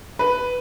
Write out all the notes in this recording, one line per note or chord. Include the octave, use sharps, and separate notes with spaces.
B4